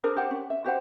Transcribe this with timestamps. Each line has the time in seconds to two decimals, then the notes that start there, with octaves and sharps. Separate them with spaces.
0.03 D4 G#4 A#4 C5
0.16 G4 C5 F#5
0.31 C#4
0.50 E5
0.64 F#4 G4 C5 F#5